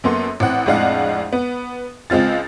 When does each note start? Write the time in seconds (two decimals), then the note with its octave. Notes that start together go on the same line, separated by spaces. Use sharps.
0.04 F#2 A#3 B3 A4 C6
0.40 A1 C4 F#5
0.66 F2 A2 G#3 D4 F5 F#5
1.33 B3
2.10 C#2 G#3 C4 F4 A6